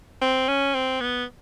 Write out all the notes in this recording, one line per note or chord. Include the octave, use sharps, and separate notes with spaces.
C4
C#4
C4
B3